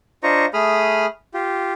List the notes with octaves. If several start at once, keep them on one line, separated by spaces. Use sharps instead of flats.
D4 F4 C5 D#5 A#5 C#6
A3 G#4 B5 D#6 F6
F4 G4